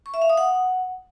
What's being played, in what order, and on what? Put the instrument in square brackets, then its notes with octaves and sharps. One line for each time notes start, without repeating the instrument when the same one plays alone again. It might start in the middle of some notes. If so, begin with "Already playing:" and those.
[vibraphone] C#6
E5
F5
D#6
F#5